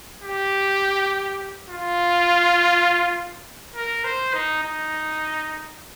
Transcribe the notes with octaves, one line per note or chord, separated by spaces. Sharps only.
G4
F4
A#4
C5
D#4
D#4